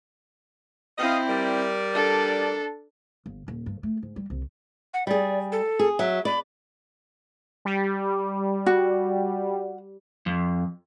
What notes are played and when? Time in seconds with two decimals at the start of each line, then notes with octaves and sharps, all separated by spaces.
0.98 C4 E4 D#5 F5
1.28 G3 A#4 D5
1.93 D4 A4
3.26 G1
3.48 D#1
3.66 G2
3.83 A3
4.03 G#2
4.16 G3
4.30 C2
4.94 F#5
5.07 G3 G#4 D5
5.52 A4
5.79 G#4
5.99 F#3 E5
6.25 D5 B5
7.65 G3
8.66 F#4
10.26 F2